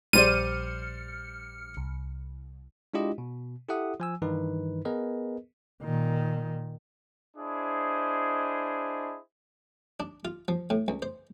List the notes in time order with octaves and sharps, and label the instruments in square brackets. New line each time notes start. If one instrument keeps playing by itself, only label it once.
[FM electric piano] A#1 F6 C#7 [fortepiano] G3 C5 D5 [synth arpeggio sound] D#7
[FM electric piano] C2
[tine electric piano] G#3 D4 E4 F4 G4 D#5
B2
E4 G4 A4 E5 F#5 D#6
F3 G#5 E6
G2 D#3 E3 D#4 B4
B3 G#4 A#4 B4 D#5
[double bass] A#2 D#3
[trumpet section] D4 E4 G#4 C5 D#5
[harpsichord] D4
F4
F3
A2
C#2
C5